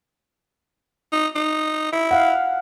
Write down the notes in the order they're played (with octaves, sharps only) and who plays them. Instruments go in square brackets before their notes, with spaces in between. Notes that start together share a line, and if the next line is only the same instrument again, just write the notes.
[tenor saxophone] D#4
D#4
E4
[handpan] F5 F#5